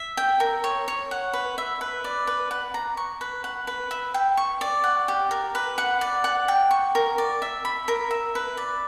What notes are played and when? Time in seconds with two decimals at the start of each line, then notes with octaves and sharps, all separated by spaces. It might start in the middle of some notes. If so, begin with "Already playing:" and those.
Already playing: E5
0.17 G5
0.40 A#4
0.64 C#5
0.88 C#5
1.11 F#5
1.33 B4
1.58 E5
1.81 B4
2.04 D5
2.27 B4
2.51 F#5
2.74 A#5
2.97 C#6
3.21 B4
3.44 F#5
3.67 B4
3.91 E5
4.14 G5
4.37 C#6
4.61 D5
4.84 F#5
5.08 G4
5.31 A#4
5.55 B4
5.78 F#5
6.01 D5
6.24 F#5
6.48 G5
6.71 C#6
6.95 A#4
7.18 D5
7.42 E5
7.65 B5
7.88 A#4
8.11 E5
8.35 B4
8.57 D5